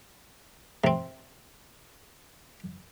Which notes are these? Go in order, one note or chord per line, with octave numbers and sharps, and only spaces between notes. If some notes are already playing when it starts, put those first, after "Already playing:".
C3 C4